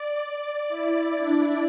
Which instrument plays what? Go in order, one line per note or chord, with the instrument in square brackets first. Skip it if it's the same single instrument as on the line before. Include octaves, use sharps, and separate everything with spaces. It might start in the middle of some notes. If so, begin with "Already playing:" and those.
Already playing: [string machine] D5
E4
D4